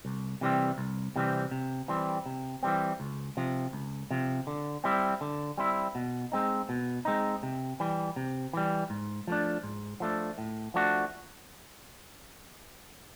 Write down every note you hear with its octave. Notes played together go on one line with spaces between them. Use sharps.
C2
C3 E3 G3 C4
C2
C3 E3 G3 C4
C3
E3 G3 C4
C3
E3 G3 C4
C#2
C3 F3
C#2
C3 F3
D3
G3 C4 E4
D3
G3 C4 E4
B2
G#3 C4 D#4
B2
G#3 C4 D#4
C3
E3 G3
C3
E3 G3
G#2
F3 A3 D4
G#2
F3 A3 D4
A2
F3 A3 D4 F#4